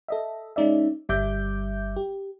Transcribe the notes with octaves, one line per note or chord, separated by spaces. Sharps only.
A4 D#5 E5
G#3 C#4 D#4 D5 E5
G1 G3 E5 D6 G6
G4